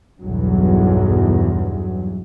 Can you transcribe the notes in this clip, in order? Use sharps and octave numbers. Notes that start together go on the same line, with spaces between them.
B1 E2 G2 F#3